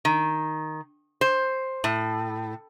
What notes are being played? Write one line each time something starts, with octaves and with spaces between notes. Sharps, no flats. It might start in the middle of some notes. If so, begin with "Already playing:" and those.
D#3
C5
A2